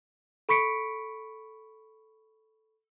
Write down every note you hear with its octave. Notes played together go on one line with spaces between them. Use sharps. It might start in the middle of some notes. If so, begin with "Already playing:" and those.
A4 B5 C#6 B6 C#7 D7